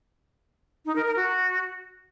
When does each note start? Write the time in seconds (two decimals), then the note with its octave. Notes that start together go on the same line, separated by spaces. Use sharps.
0.86 D#4
0.96 A#4
1.06 A#4
1.16 F#4